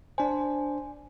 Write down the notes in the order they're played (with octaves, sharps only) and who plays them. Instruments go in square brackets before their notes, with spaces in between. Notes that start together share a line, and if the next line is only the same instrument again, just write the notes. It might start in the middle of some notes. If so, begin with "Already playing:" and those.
[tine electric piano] D4 C5 [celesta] G#5